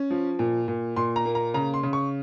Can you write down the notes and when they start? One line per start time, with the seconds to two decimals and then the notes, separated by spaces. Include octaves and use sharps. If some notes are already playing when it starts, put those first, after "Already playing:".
Already playing: C#4
0.10 F3
0.39 A#2
0.68 A#2
0.96 A#2 C6
1.16 A#5
1.25 A#3
1.35 A#5
1.54 C#3 A#5
1.74 C6
1.83 C#3
1.93 C#6